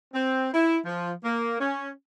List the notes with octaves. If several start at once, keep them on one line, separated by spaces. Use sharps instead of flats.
C4
E4
F3
A#3
C#4